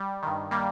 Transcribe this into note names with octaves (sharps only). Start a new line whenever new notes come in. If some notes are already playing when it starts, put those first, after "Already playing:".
Already playing: G3
G2 D#3
G3 A#3